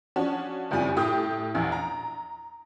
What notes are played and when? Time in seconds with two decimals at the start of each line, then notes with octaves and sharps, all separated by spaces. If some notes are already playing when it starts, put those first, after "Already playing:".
0.16 F3 C#4 D4 F#4
0.71 F#1 F2 F3 G3 G4 G#5
0.96 A2 G4 G5 D#6
1.54 A#1 E2
1.72 A#5